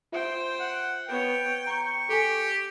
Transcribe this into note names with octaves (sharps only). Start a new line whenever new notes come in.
F4 C5 E5 G5
F#5
B3 C#5 G5
A#5 C#6
G4 A4 G#5